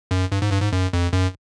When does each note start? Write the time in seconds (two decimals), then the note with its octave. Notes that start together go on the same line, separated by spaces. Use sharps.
0.11 F#2
0.32 G2
0.42 G#2
0.52 G2
0.62 G#2
0.73 F#2
0.93 F2
1.13 F#2